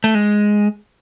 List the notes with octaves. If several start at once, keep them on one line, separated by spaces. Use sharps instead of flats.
A3
G#3